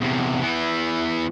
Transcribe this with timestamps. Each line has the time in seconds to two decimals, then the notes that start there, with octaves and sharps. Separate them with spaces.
0.01 E2 C3
0.42 E3 B3